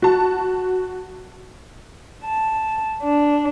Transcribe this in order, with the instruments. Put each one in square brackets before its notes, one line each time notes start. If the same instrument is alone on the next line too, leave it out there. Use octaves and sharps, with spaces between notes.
[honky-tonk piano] F#4 A5
[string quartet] A5
D4